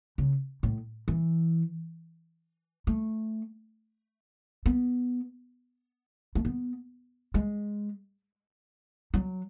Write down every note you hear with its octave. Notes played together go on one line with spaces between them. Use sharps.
C#3
A2
E3
A3
B3
A3
B3
G#3
F#3